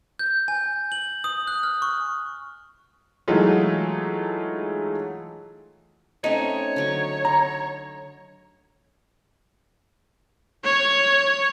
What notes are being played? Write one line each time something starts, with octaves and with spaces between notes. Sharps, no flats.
G6
G#5
F#7
D#6
F#6
F6
C#6
E3 F#3 G#3 A3 D#4 F4
A3 C4 C#4 D#4 C#5
D3 F#3 C#6
A#5
C#5